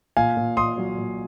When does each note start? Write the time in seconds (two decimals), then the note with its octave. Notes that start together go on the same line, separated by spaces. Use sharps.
0.17 A#2 F5 G#5
0.37 A#2
0.57 A#2 C6 D#6
0.78 F#3
0.98 A#2